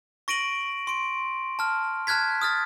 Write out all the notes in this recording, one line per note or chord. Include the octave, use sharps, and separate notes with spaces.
C#6 A#6 D7 D#7 F#7
C6 D7
A5 F6
A5 F6 F#6 G#6 B6
D#6 F6 A6